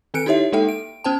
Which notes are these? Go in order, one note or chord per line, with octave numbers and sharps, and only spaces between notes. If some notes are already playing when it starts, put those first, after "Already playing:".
D#3 C4 A4 F#6 C#7 D7
D#4 E4 G4 C#5 E5
G#3 A#3 D#4 A4 E5 G5
D7
B3 C#4 C5 G5 A5